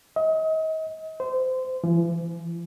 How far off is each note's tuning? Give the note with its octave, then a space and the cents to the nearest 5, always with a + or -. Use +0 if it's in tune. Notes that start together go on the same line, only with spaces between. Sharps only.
D#5 +35
C5 -25
E3 +45